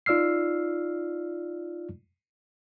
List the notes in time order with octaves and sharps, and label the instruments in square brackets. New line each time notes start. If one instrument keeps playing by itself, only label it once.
[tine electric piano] D#4 F4 D5 E6 F6 C7